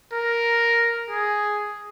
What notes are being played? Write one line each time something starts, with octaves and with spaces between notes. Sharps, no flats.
A#4
G#4